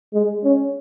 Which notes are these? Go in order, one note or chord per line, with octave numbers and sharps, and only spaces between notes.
G#3
C#4